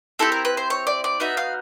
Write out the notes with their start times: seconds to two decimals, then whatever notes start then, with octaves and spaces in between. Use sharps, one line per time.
0.19 C4 E4 G4 A4
0.32 A#4
0.45 B4
0.57 C5
0.70 C#5
0.87 D5
1.04 D5
1.20 B3 D#4 F#4 E5
1.37 F5